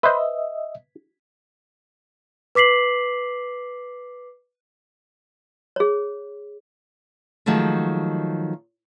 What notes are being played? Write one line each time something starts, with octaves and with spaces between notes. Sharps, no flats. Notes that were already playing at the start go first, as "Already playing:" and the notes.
B4 C5 D#5 E5
B4 D6 B6 C7 F#7
G#4 C#5
D#3 F3 F#3 G#3 A3